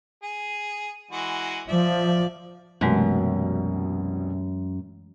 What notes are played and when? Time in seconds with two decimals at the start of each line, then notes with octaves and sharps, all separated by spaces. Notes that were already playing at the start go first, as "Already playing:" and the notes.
0.23 G#4
1.11 E3 G#3 F#4
1.68 F3 D5 E5
2.81 C2 F#2 B2 E3 G#3 A3